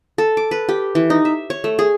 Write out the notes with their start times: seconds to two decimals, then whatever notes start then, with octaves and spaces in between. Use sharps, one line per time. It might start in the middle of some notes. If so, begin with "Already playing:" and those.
0.18 A4
0.37 D6
0.51 B4
0.69 G4
0.95 E3
1.10 D#4
1.25 E5
1.50 C#5
1.64 A3
1.79 G#4